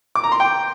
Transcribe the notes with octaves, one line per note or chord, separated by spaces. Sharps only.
D6
A#5
C6
G5